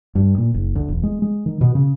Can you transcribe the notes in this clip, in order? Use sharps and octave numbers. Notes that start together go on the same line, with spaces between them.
G2
A#2
F#1
D2
E1
G#3
G#3
D#3
B2
C#3